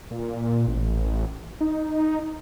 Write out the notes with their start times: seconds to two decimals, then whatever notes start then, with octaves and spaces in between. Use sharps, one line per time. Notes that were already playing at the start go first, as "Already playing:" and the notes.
0.11 A#2
0.68 A1
1.61 D#4